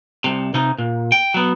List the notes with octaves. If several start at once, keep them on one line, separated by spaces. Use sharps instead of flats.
C2 C3
C3 D#4
A#2
G5
F#3 B3